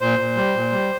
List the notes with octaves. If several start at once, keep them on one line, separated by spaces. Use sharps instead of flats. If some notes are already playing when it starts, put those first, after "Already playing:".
A#2 C5
A#2
G3
A#2
G3